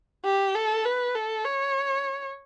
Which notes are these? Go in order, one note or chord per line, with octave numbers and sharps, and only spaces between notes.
G4
A4
B4
A4
C#5